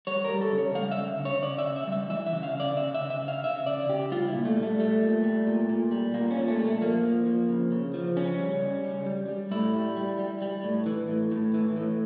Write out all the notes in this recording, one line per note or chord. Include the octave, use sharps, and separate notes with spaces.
G3 C#5
A#4
G3
A4
C#3
C#5
G3 F5
E5
C#3
C#3
C#5
C#3 D5
E5
C#3
E5
G3 E5
E3 E5
E5
C#3
F5
C#3 D5
C#3 E5
C#3 E5
E5
C#3
F5
C#3 E5
C#3 D5
C#3 G4
G3 F4
E4
A#2
A3
G3
A3
G3 A3
A#2
G3
A#2
A#2
G3
A#2 A#3
C#4
A#2
A3
G3
A3
F3 A#3
F3
F3
C#3
C#3
F3
C#3 C#4
G3
C#3
G3
G3
G3
A2 E4
G3
G3
G3
G3
A2
E3
A2
A2
E3
A2